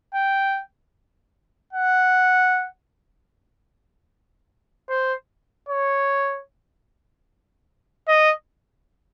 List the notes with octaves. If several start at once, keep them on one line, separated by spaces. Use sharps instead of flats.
G5
F#5
C5
C#5
D#5